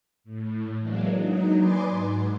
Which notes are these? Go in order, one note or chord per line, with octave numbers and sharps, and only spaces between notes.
A2
E3 F#3 G#3 A#3 D4
F#3 D#4
B4 D5 D#5 G#5 C6 D6
G#2